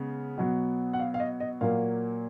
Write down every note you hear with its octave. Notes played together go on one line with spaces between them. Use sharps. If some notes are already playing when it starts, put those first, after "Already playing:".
Already playing: C#3 G#3 B3
B2 F#3 B3
F#5
F5
F5
D#5
D#5
A#2 F#3 A#3 F5